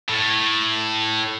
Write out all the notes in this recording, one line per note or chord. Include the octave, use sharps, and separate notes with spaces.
A2